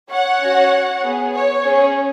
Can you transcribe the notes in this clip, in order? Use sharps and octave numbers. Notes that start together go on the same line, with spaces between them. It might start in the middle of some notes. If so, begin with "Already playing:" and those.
C#5 F#5
C#4 F#4
B3 G#4
C#5
C#4 G#4